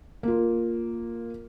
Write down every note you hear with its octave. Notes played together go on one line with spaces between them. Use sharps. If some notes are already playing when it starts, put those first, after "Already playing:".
A#3 F4